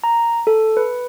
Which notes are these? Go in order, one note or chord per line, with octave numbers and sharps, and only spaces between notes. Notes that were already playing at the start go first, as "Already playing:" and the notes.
A#5
A4
B4